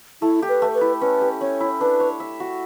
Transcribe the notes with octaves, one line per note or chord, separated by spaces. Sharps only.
A3 E4
G4
B4
A3
B4
E4
C#4 B4
G4
C#4 C#5
E4
D4 B4
C#5
E5
F#4